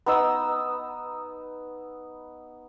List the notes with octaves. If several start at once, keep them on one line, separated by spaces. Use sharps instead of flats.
B3 D#4 D#6 E6